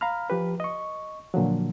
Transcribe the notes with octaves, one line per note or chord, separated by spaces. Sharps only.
F5 A#5 B5 F6
F3 G4 B4
D#5 C#6
A#2 D3 F3 F#3